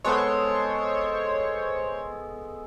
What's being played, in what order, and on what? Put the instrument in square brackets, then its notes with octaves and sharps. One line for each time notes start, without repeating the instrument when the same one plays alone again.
[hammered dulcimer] G#3 B3 A4 [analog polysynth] C5 C#5